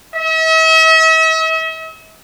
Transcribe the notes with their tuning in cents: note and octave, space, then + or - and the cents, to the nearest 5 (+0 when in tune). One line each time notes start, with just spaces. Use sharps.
E5 -45